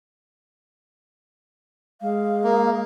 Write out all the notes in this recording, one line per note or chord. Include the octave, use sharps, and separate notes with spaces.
G#3 F5
A#3